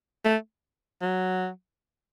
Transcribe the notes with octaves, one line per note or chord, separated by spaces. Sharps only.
A3
F#3